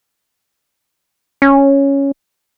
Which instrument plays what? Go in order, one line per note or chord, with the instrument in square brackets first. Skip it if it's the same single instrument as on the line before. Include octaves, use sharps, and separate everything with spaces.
[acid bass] C#4